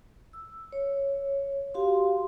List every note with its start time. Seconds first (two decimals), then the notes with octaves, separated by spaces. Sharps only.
0.33 E6
0.73 C#5
1.74 F#4 G4 F5 C6